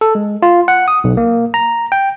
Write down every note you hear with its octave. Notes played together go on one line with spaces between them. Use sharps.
A4
G#3
F4
F#5
D#6
B1
A#3
A#5
G5